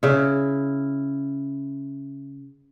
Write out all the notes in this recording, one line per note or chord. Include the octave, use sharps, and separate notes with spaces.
C#3 E4